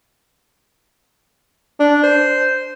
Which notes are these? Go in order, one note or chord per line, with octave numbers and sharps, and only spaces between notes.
D4
C5